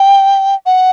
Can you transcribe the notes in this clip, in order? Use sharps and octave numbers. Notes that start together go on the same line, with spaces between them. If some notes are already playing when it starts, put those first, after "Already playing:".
Already playing: G5
F#5